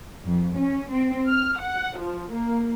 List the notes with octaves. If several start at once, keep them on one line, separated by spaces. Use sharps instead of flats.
F2
C#4
C4
F6
F#5
F3
A#3